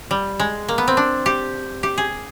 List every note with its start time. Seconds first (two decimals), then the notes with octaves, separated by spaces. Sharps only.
0.11 G3
0.39 G#3
0.68 A#3
0.78 B3
0.88 C4
0.97 D4
1.26 G4
1.83 G4
1.98 G#4